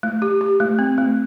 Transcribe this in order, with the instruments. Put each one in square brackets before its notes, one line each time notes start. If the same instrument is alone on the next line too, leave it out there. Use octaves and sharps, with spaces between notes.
[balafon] A3
G4
G4
A3
C4
A3